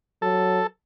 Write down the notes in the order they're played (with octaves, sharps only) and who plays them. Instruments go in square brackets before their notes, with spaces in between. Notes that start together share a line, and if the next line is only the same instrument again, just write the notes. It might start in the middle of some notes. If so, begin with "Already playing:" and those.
[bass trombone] F#3 [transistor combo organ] A4